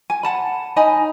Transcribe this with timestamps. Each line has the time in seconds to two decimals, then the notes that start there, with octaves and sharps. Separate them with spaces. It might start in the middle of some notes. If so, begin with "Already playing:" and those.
0.10 G#5
0.23 F#5 A5 B5
0.76 D#4 D#5 G#5 B5